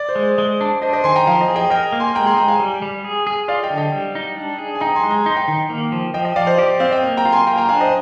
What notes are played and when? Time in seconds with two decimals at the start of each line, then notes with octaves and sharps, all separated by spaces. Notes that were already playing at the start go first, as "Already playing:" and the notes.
Already playing: D5
0.09 C5
0.16 G#3
0.23 C5
0.38 G#3
0.61 D4
0.82 D4 C5 D#5
0.93 C5 D#5
1.04 D#3 G#5 C6
1.16 G5 A#5
1.26 F3 F5 G#5
1.41 D#5 G5
1.48 G#4
1.56 D#5 G5
1.70 A#4 D#5 G5
1.92 A#3
2.00 G#5 C6
2.15 G#3 G5 A#5
2.26 G#5 C6
2.37 G#3 G5 A#5
2.48 F5 G#5
2.60 G3
2.82 G3
3.04 G#4
3.27 G#4
3.48 F4 D5 F5
3.63 D#5 G5
3.70 D3
3.77 D#5 G5
3.92 G3
4.15 D#4
4.37 D4
4.58 G#4
4.75 G#5
4.81 D#4 G5 A#5
4.95 G#5 C6
5.04 G#3
5.11 A#5
5.24 D#4 C6
5.36 G5 A#5
5.48 D#3
5.70 A#3
5.92 F3
6.14 F3 D#5 G5
6.25 D#5 G5
6.36 F3 D5 F5
6.47 C5 D#5
6.58 G4 D5
6.80 C4 D5 F5
6.91 D#5 G5
7.03 A#3
7.17 G5 A#5
7.25 F4
7.32 G#5 C6
7.47 A#3 G5 A#5
7.58 G5 A#5
7.69 D4 F5 G#5
7.80 C5 D#5